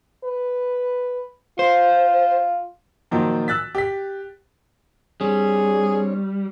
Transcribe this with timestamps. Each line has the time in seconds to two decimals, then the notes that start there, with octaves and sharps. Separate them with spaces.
0.24 B4
1.59 F4 C5
3.11 A#2 D#3 F3 F#3
3.48 E6 F#6 A6 B6
3.75 G4 B6
5.21 G3 C4 D4 G#4 C#5